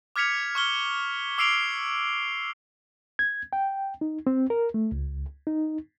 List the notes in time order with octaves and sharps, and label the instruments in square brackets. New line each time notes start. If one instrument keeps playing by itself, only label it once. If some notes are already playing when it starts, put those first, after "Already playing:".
[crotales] D6 F6 G#6 B6 C#7 F7
C#6 F6 G7
D6 E6 C7 D7 F7 G7
[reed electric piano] G#6
G5
D#4
C4
A#4
A3
C#2
D#4